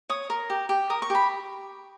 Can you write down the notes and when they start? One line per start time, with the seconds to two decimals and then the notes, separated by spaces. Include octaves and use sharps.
0.10 C#5 D#6
0.30 A#4
0.50 G4
0.69 G4
0.90 A#4 D#6
1.02 C#6
1.10 G4 B5